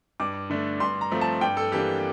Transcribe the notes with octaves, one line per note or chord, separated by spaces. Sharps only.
G2 D6
D3 A3 D4
G2 C6
A#5
F3 A3 C4
A5
G2 G5
A4
E3 A#3 D4 G4